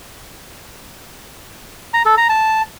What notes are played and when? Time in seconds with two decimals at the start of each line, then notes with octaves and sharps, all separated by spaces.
1.94 A#5
2.05 A4
2.17 A#5
2.29 A5